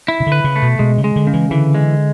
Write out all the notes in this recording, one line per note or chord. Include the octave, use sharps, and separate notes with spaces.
E4
C#3
D3
B4
C#3
A3
B2
B2 G#3
C#3
G#3
D3
C#3
E3
D3 E3
G#3